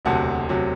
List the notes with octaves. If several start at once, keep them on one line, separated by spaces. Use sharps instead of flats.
E1 D2 C3 F#3 F#5 A5
C3 F#3